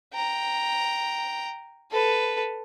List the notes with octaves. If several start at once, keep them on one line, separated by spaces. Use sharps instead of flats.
G5 A#5
A4 B4